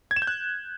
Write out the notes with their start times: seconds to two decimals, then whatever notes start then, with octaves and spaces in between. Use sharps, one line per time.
0.11 G#6
0.16 E7
0.22 G6
0.27 F#6